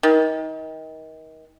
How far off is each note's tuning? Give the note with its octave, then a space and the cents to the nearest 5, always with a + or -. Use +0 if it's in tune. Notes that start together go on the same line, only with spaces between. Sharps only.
D#3 +30